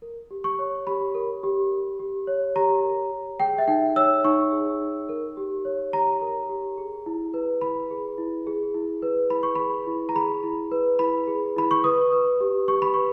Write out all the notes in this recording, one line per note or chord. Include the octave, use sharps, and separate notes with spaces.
A#4
G4
C#6
C#5
G4 B5
A#4
G4
A#4
G4
C#5
G4 A#5
A#4
G4
G#4 G5
E5
D#4 G5
C#5 E6
D#4 C#6
G#4
D#4
A#4
G4
C#5
G4 A#5
A#4
G4
G#4
E4
B4
E4 B5
G#4
E4
G#4
E4
B4
E4 B5
C#6
G#4 B5
E4
A#5
G#4 B5
E4
B4
E4 B5
G#4
E4 B5
C#6
B4 D#6
B4
G4
G4 C#6
B5
B4 C#6